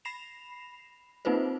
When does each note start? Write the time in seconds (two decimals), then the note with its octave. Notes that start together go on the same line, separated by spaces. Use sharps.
0.05 B5 A#6 C7 E7 F7
1.25 A#3 C4 D#4 F4 B4 C5